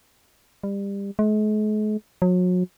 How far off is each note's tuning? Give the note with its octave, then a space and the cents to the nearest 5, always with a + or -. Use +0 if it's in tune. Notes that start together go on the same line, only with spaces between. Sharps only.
G3 +25
G#3 +45
F#3 -35